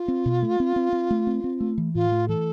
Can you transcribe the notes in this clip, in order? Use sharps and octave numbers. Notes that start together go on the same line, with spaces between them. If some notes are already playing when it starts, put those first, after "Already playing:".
Already playing: F4
C4
B2
A3
C4
C4
C4
A3
C4
C4
A3
E3
A2 F4
A3
E3 A4